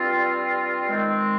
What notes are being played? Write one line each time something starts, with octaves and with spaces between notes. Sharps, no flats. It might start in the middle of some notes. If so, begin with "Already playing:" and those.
Already playing: G2 G3 C4 F4
D#3 G#3 C4